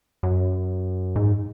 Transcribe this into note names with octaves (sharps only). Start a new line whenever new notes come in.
F#2
G#2